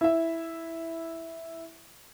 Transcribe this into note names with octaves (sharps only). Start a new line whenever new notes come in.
E4 E5